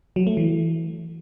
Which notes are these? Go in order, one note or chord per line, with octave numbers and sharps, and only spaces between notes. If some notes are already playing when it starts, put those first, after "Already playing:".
F#3
A3
E3